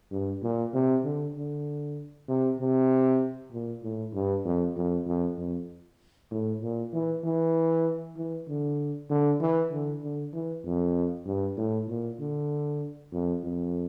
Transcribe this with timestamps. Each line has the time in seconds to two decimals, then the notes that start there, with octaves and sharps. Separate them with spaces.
0.12 G2
0.43 A#2
0.74 C3
1.04 D3
1.36 D3
2.28 C3
2.59 C3
3.52 A#2
3.83 A2
4.14 G2
4.45 F2
4.76 F2
5.07 F2
5.37 F2
6.31 A2
6.62 A#2
6.93 E3
7.24 E3
8.17 E3
8.48 D3
9.10 D3
9.41 E3
9.72 D3
10.03 D3
10.33 E3
10.64 F2
11.26 G2
11.57 A2
11.88 A#2
12.20 D3
13.12 F2
13.43 F2